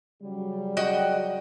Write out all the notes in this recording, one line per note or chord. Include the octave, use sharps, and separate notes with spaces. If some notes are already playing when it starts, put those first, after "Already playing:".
C#3 F#3 G3
F#4 D#5 G5